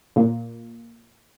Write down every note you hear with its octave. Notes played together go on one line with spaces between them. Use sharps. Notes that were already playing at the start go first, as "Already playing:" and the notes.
A#2